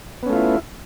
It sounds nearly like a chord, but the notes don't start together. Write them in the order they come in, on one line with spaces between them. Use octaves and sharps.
B3 C#4 A3 F4 E4